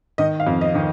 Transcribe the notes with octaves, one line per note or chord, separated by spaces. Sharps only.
D#3 D#5
F5
F2
D#5
D#3